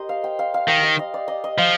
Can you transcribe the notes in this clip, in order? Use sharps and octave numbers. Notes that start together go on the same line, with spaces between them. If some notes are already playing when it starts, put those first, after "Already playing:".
Already playing: G4 A#4 C5 D#5
F5
G5
F5
F5
D#3 G5
F5
D#5
D5
D#5
D#5
F3 F5